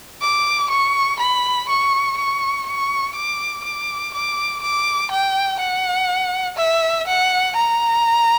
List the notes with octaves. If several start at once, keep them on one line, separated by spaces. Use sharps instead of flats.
D6
C#6
B5
C#6
C#6
C#6
D6
D6
D6
D6
G5
F#5
E5
F#5
A#5